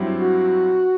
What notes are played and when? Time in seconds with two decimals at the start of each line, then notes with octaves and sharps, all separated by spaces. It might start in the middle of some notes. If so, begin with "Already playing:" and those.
Already playing: G2 F#3 C4 E4 G4
0.15 F#4